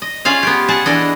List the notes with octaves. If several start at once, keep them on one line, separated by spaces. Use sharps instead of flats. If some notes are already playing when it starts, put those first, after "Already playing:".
D#5
C#4 F4 G#4 F5
B3 G4
G#4 F#5 A5
E3 D4 D#5